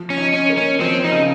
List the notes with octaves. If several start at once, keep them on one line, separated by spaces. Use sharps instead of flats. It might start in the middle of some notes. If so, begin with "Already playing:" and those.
Already playing: F3
C#4
D#4
C#4
A#3
C#4
F3 C4
D#4
C#3